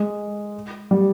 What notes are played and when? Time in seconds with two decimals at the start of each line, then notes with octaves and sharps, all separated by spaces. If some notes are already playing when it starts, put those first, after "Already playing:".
Already playing: G#3
0.91 G3